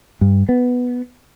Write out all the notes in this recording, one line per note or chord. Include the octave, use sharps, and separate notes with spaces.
G2
B3